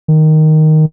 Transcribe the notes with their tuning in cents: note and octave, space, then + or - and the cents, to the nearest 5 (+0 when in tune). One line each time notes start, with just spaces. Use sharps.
D#3 +0